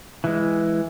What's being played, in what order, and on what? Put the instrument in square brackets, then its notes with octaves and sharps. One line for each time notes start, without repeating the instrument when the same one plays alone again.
[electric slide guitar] E3 G#3